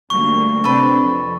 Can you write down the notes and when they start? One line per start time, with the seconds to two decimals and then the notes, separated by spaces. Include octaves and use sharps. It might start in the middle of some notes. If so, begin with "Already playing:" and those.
0.10 D2 G3 A#3 C#6
0.64 C3 C4 D4 A4 B4
1.01 F2